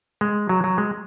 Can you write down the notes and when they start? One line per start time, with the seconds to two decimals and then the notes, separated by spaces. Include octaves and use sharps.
0.21 G#3
0.49 F#3
0.64 F#3
0.78 G#3